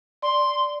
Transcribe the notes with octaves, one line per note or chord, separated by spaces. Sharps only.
D5 C6